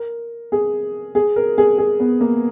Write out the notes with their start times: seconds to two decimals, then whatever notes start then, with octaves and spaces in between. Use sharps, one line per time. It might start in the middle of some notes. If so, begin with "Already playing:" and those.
Already playing: A#4
0.52 G#4
1.15 G#4
1.36 A#4
1.58 G#4
1.78 G#4
2.00 B3
2.21 A#3